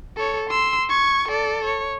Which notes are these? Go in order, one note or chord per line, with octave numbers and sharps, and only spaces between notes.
A4 C#5
C6 E6
C#6 G#6
A4 D5
C#5